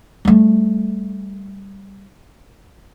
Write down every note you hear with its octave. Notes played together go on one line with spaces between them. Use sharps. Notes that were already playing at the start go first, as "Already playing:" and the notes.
G3 A3